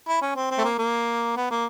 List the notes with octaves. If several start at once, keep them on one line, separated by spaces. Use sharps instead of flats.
E4
C#4
C4
C4
A3
A#3
A#3
B3
A#3